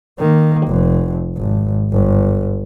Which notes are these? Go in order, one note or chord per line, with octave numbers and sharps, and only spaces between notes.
D#3 A#3
F1 F2
G#1
G1